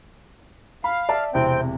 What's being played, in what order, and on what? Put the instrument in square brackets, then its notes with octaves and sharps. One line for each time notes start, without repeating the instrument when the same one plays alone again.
[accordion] F5 [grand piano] B5
[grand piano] D5 E5 A5
[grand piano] E1 C3 E4 [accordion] C4 G5